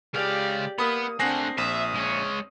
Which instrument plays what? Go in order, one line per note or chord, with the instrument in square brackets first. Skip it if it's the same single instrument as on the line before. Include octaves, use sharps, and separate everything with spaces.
[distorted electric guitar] C#2 F5 [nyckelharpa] G4 D5 [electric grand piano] G#4
[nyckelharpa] A#3 [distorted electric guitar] B3 [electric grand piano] B5 D#6
[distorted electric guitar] A3 F#5 [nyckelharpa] C4 D4 [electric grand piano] G#5 A#6 C7
[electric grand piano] A#1 [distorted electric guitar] E5 [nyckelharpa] D#6
[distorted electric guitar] G#3 C#5